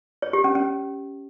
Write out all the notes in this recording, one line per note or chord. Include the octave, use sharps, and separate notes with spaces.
C#5
G4
C#4
C#4